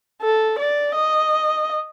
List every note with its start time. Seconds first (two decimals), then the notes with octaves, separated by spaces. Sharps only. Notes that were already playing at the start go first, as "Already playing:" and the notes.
0.22 A4
0.59 D5
0.95 D#5